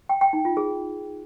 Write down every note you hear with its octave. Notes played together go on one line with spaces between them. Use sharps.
G5
G5
D#4
F4
G#4